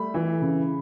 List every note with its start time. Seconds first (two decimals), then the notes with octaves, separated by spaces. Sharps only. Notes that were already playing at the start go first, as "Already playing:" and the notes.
Already playing: G3 A3 B5
0.14 E3
0.42 C#3